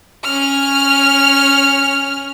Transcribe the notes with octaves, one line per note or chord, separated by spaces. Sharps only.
C#4 F6